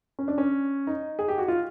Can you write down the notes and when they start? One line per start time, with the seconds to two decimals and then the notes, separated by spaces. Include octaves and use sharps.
0.19 C#4
0.28 D4
0.38 C#4
0.87 D#4
1.19 G#4
1.28 G4
1.38 F#4
1.48 F4